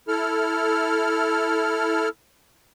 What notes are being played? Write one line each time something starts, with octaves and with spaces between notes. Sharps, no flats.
E4 A4 F6